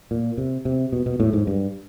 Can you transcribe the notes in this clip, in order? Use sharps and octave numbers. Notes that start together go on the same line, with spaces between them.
A#2
C3
C3
B2
B2
A2
G#2
G2